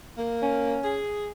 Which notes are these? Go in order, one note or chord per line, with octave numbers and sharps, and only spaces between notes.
A#3
C#4
G#4